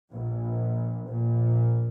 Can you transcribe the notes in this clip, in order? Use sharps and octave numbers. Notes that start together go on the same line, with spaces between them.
A#1 A#2
A#1 A#2